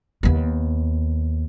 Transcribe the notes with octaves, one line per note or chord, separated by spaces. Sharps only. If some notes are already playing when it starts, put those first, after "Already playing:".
D#2 B3